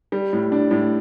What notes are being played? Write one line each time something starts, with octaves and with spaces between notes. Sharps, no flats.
G3
A2
D4
A2